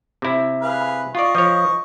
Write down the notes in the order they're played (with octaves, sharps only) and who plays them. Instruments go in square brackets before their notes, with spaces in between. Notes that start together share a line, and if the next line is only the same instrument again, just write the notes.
[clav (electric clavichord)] C3 E4
[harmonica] G#4 B4 F5
[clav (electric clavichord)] F4 D5 [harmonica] D#5 C#6
[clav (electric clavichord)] F3 C#5